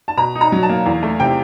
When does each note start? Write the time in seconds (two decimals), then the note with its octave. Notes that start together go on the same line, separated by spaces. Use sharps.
0.08 A5
0.17 B2 A#5
0.35 D#4
0.41 A#5
0.52 F#3
0.63 A5
0.69 A#3
0.86 E2
1.03 A3
1.20 C3 G5